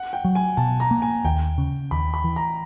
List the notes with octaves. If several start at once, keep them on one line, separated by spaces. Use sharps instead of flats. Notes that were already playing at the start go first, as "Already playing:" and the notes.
Already playing: F#5
G5
F#3
G#5
B2 A5
A#5
A#3
G#5
D#2 G5
C#3
D#2 B5
B5
E3
A#5